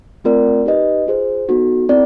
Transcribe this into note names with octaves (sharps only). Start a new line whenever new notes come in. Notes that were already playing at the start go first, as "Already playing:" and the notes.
A3 C4 F4 A#4 D5
D#4 G4 B4 D#5
F4 G#4 C5
B3 D#4 F#4 A4
C4 E4 A4 D5